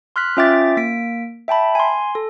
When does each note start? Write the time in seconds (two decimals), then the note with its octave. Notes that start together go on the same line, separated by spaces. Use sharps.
0.16 C6 F6 F#6 B6
0.37 C#4 F4 E5 G5 D6 A6
0.77 A#3 B6 D7
1.48 E5 G5 A5 B5
1.75 G#5 C6
2.15 A4